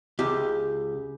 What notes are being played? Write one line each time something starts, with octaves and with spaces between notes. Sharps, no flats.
C#2 G4